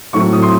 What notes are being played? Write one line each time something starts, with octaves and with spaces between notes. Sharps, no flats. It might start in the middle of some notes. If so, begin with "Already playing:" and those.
A2 F#3 A3 C4 C#6
D#6
C6